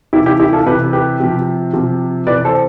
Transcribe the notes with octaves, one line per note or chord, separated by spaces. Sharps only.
C3 E3 E4 G4
E4 G4
E4 G4
F4 A4
C3 E3 G4 B4
G4 B4
C3 F3
C3 F3
C3 E3 B4 D5
A4 C5